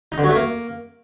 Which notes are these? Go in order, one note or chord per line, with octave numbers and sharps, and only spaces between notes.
D#4
D3
F#3
A3
A#3